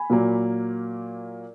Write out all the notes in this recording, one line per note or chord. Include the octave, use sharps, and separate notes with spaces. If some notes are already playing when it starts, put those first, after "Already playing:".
Already playing: G#5 B5
A#2 F#3 A#3